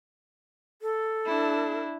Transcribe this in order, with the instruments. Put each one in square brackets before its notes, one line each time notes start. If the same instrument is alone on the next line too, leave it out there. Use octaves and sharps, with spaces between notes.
[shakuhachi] A4
[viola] D4 E4